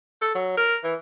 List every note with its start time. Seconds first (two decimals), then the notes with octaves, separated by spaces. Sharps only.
0.21 A4
0.35 F#3
0.57 A#4
0.84 E3